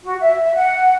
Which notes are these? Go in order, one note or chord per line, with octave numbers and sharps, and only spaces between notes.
F#4
E5
E5
F#5